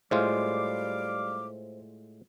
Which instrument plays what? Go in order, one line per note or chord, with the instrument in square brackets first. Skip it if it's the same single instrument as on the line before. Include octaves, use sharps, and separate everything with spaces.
[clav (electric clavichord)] A2 G#3 F4 [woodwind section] G3 F5 D6 [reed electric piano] C5